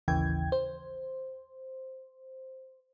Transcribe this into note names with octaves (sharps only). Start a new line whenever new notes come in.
A1 D#2 C#3 E3 G5 G#6
C5